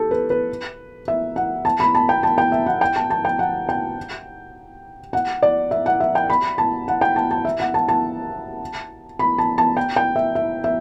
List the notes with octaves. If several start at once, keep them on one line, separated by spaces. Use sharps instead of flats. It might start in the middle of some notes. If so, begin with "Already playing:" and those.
Already playing: G4 A4
B4
B4
E5
F#5
A5
B5
A5
G5
A5
G5
E5
F#5
G5
A5
A5
G5
F#5
G5
F#5
D5
E5
F#5
E5
G5
B5
A5
F#5
G5
A5
A5
E5
F#5
A5
A5
B5
A5
A5
G5
G5
E5
E5
E5